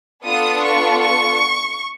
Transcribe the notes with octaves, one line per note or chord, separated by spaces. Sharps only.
B3 D4 F4 A4 D#6
C#6
C#6